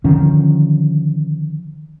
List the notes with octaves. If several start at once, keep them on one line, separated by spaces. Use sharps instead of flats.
D3 D#3 F3 C#4